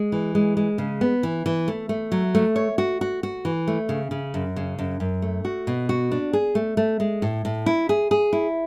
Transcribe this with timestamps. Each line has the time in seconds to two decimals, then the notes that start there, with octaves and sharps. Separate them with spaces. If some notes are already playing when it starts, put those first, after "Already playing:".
Already playing: G#3
0.12 E3
0.35 G#3
0.57 G#3
0.78 C#3
1.01 B3
1.23 E3
1.46 E3
1.68 A3
1.89 A3
2.12 F#3
2.35 A3
2.56 C#5
2.78 F#4
3.01 F#4
3.23 F#4
3.45 E3
3.67 A3
3.89 C#3
4.11 C#3
4.34 F#2
4.56 C#3
4.78 F#2
5.00 F#2
5.22 A3
5.45 F#4
5.67 B2
5.89 F#4
6.11 D4
6.33 G#4
6.55 A3
6.77 A3
7.00 G#3
7.22 A2
7.45 A2
7.66 E4
7.89 G#4
8.11 G#4
8.33 E4